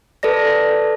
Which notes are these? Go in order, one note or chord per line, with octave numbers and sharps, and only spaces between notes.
A4 B4 D5 A#6